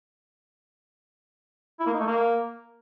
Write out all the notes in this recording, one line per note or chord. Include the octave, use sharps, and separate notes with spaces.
E4
A#3
D#4
A3
A#3